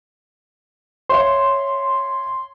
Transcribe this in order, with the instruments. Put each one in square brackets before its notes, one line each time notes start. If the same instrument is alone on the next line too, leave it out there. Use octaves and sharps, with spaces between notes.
[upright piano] C#5 E5 F5 [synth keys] C6